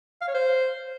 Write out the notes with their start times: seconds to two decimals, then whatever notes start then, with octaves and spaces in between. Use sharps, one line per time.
0.21 F5
0.28 C#5
0.34 C5